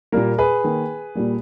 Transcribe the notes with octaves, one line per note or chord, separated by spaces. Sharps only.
A#2 G3 A#3 A#4
G#4 B4
D#3 A#3
A#2 G3 A#3